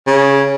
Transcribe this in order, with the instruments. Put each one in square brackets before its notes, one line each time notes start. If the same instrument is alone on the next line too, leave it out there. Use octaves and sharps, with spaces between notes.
[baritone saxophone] C#3